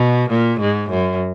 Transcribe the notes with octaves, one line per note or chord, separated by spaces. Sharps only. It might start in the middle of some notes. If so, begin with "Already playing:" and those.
Already playing: B2
A#2
G#2
F#2